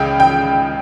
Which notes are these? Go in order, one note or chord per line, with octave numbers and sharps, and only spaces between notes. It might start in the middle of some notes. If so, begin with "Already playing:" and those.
Already playing: C#2 C#3 G5
G5